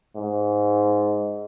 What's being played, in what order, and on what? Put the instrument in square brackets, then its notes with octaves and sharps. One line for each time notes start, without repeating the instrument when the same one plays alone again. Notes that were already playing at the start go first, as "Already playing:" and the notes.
[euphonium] G#2